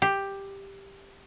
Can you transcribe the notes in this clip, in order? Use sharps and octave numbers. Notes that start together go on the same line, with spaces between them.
G4